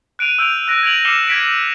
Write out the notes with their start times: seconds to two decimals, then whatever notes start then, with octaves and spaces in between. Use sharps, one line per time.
0.19 F#6 D7 D#7 F7
0.39 E6 G6 D7 F7
0.68 F#6 A#6 D7
0.83 G#6 D7 F7 F#7
1.05 D6 F6 C7 C#7 E7 G7
1.28 G#6 B6 D7